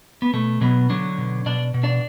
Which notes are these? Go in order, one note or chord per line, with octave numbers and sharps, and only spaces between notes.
B3
B2 A3
B2 F#3 B3
D3 F#3 D4
B2
B2 D4 D5
B2
D4 D5